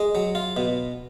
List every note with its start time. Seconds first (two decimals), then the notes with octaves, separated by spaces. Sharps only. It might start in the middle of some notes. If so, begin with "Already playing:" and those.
Already playing: G#3
0.15 F#3
0.35 F4
0.57 B2